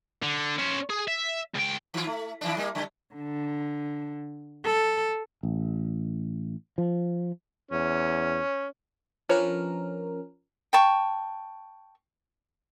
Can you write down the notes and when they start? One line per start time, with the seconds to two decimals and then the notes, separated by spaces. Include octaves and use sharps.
0.22 D3
0.58 C#4 C5
0.90 G#4
1.08 E5
1.55 C#2 G5
1.94 D#3 F4
2.07 A3
2.41 D#3 E3 D4
2.57 G3 A#3
2.75 C#3 G3
3.15 D3
4.65 A4
5.43 A1
6.78 F3
7.71 E2 C#4
9.29 F3 C#4 D4 A#4 B4 C#5
10.73 G5 A5 C#6